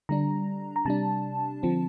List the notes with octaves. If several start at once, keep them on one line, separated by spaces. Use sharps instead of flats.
D3 G3 D4 A#5
A#5
C3 G3 D4 A5
D3 F3 C4